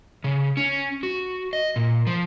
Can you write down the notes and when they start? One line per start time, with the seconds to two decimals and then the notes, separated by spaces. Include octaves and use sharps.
0.24 C#3
0.57 C#4
1.03 F#4
1.53 D#5
1.76 A#2
2.07 F3